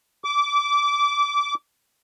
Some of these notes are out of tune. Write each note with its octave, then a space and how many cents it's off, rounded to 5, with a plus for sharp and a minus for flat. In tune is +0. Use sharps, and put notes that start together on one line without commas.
D6 -20